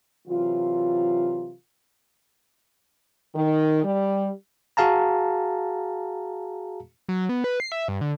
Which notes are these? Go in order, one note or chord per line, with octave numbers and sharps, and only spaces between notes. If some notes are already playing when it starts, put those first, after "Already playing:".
C3 E3 F#3 F4
D#3
G3
F#4 G#4 F5 A5 A#5
F#3
B3
B4
C7
E5
G2
D3